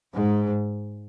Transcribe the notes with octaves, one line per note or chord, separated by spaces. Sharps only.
G#2